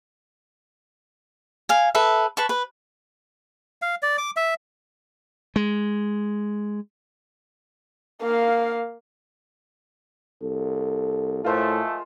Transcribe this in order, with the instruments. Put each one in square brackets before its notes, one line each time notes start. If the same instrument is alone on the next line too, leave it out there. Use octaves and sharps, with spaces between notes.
[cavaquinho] F5 G#5
A4 B4 E5
B4 A5 C#6
B4
[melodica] F5
D5
D6
E5
[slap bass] G#3
[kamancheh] A#3 F5
[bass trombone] C2 [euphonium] A4
[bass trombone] A2 [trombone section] F3 G#3 A3 [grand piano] F4 A#4 C5